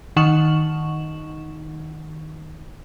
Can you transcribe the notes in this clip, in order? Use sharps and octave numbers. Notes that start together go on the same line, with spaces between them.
D#3 D#4 F#5 C#6 E7 F#7